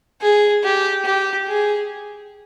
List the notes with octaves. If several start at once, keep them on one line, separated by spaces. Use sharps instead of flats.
G#4
G4
G4
G#4